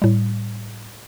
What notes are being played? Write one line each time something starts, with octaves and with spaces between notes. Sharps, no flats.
A2 G3